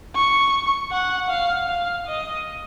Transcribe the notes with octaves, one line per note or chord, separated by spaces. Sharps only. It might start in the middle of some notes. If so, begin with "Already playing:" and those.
C#6
F#5
F5
F5
D#5